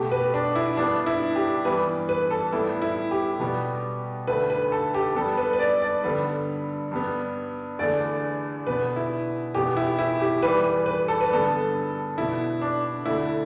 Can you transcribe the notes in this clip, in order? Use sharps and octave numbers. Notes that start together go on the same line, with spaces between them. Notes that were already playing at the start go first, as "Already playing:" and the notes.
Already playing: B2 A3 G4
B4
D4
E4
G2 G3 B3 D4
E4
G4
G2 E3 G3 B3 B4
B4
A4
A2 G3 B3 E4
E4
G4
B2 G3 B3
D2 D3 A3 B4
B4
A4
G4
G2 G3 B3 A4
B4
B4
D5
D5
G2 D3 G3 B3 B4
G2 G3 B3
E2 D3 A3 D5
B2 B3 B4
E4
E2 B2 B3 G4
E4
E4
G4
E2 E3 G3 B4
B4
B4
A4
B4
G2 D3 G3 B3 A4
B2 B3 E4
D4
D2 D3 A3 E4